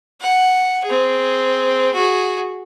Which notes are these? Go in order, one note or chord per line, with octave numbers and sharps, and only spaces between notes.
F#5
C4 G#4
F#4 G#4